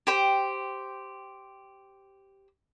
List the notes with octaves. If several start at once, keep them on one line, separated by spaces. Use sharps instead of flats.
G4 C5 G5